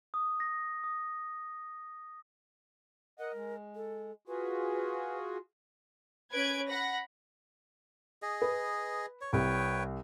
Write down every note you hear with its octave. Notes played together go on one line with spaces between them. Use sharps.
D#6
A#6
D#6
A#4 D#5 F#5
G#3
A4
F4 F#4 G#4 B4
C#4 B4 G#6 D7
F#5 B5 A#6
G#4 D#5
B4
C#5
C2 B4 C#5 G5